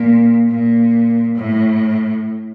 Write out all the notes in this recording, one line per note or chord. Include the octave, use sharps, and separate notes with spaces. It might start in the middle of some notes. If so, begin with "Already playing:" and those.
Already playing: A#2
A#2
A2